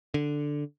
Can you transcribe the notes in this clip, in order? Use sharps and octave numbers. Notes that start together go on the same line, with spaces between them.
D3